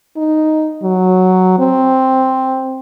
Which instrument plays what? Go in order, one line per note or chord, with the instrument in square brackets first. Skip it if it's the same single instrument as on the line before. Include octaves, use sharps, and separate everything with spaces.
[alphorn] D#4
F#3
C4